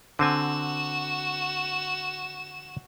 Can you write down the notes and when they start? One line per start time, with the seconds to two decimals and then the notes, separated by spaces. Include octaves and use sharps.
0.19 D3 C4 F#4 G#5 E7